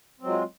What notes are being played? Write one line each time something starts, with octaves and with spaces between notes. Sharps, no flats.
F#3 G#3 C4 F4